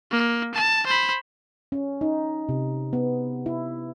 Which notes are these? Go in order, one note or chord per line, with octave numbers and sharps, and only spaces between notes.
A#3
A5
C5 B5
C#4
D#4
C3
B3
E4